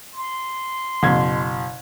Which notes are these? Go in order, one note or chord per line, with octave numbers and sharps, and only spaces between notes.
C6
F#1 B2 G#6